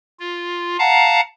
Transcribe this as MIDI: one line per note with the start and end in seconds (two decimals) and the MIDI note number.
0.20 0.77 65
0.79 1.21 77
0.79 1.21 78
0.79 1.21 81
0.79 1.21 82